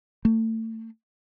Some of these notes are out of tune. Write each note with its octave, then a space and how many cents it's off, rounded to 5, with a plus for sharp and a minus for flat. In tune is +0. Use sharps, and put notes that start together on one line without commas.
A3 +30